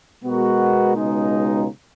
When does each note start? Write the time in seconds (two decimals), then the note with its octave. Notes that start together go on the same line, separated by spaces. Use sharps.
0.23 B2 G#3 B3 F#4 A#4
0.94 C#2 B2 G#3 D#4